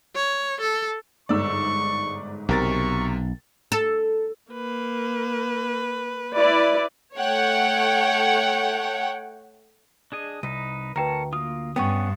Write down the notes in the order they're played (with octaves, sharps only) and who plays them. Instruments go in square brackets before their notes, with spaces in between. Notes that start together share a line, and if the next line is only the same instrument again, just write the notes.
[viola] C#5
A4
[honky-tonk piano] G1 G#2 E6 [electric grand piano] D5 [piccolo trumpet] C#6
[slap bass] B1 [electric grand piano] C3 A#4 A6 [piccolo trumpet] C#6
[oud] A4
[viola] A#3 B4
[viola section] E4 D5 [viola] B4
[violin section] A3 C#5 F#5 G5
[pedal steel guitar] D4 G#4 D#5
[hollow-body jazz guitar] C2 [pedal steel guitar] D#4 B4 D#5
[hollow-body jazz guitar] D2 [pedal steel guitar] A#4 C#5 A5 [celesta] B4 G5 A#5
[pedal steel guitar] A#3 F4 [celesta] D#6
[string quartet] G2 [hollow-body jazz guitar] B3 C#4 [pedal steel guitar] F#5 D#6 [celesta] G5 C#6